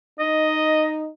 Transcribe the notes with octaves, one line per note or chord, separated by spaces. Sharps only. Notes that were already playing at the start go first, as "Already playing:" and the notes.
D#4 D#5